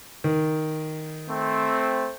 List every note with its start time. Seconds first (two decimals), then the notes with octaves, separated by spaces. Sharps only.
0.24 D#3
1.29 A3 C4